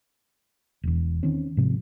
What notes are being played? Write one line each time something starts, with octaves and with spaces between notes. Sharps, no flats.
E1 E2
D#3 C4 C#4
G#2 C3 F3